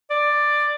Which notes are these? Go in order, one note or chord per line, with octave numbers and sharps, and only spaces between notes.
D5